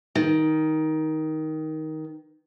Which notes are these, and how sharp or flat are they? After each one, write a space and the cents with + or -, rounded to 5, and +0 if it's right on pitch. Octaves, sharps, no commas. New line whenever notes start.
D#3 +10